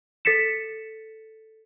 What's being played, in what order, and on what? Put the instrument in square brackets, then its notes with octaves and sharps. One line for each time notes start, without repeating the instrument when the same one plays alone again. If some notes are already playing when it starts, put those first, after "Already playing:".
[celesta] A4 A6 B6 C#7 E7